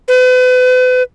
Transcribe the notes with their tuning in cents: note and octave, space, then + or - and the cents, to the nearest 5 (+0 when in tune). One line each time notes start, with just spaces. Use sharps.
B4 +40